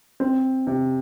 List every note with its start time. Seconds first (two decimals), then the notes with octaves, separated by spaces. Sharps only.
0.20 C4
0.67 C3